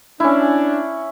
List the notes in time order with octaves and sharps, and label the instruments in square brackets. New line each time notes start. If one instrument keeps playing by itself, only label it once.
[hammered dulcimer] C#4 E4 [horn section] D4